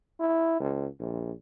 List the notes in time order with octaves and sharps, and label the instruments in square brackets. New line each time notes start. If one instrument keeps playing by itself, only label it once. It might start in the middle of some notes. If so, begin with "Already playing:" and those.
[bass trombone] E4
C#2
A#1